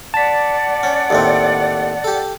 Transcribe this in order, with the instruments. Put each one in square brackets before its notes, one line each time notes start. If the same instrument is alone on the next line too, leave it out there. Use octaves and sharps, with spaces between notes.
[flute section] D5 F#5 [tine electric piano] A5 B6
[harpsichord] C#4
D#2 A2 C4
G4 A4